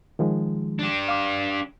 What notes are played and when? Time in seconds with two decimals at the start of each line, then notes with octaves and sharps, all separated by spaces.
0.19 D#3 F3 G#3
0.79 D4 G4
1.08 F5 D6